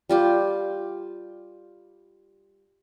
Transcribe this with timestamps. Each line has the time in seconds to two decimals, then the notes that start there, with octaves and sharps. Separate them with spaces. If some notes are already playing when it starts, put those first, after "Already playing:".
0.09 G3 F4 G4